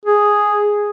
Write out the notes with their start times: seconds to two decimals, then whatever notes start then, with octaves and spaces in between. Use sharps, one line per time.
0.05 G#4